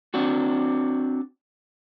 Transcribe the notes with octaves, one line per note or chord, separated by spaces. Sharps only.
C4 D4 F#4